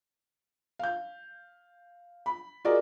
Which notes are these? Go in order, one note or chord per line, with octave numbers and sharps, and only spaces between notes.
F5 G6
B5
F4 F#4 G#4 A#4 D5 D#5